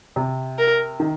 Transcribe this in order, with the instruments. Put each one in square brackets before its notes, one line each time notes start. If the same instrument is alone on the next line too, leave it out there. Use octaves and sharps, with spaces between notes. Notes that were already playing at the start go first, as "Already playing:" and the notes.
[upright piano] C3
[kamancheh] A#4
[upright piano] D#3